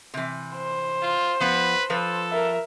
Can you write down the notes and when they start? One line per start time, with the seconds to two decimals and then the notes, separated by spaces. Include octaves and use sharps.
0.14 C3 E3
0.55 C5
1.02 F4
1.40 F3 B3 B4
1.90 F3 A4 B4
2.31 A#4 E5